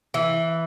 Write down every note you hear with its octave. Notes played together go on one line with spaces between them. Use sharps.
E3